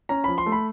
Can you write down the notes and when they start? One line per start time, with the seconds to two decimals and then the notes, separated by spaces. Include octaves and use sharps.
0.09 C#4 A#5
0.24 F3 B5
0.38 C6
0.46 A3
0.52 B5